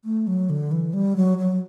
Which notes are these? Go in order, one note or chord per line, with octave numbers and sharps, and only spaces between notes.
A3
F#3
D3
E3
G3
F#3
F#3